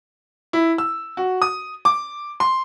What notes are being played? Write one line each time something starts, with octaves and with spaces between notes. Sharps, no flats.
E4
E6
F#4
D#6
D6
C6